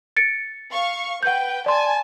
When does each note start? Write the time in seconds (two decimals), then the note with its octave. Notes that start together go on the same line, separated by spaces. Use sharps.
0.17 A6 C#7 D7
0.71 F5 C#6
1.23 B4 F#5 G5 G6
1.66 D5 G#5 A5 C6